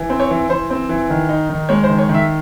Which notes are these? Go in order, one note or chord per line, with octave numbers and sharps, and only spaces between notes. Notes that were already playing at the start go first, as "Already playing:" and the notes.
Already playing: E3
C4
C#5
E3
E3 C5
C4
E3
D#3
D#4
D#3
G#3 C#5
C5
D#3
C#5
D#3
E5